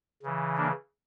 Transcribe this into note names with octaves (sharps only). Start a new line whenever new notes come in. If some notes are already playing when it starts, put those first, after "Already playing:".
C#3 E3
A#3 D4